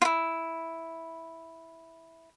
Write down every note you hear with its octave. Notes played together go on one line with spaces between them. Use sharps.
E4 F4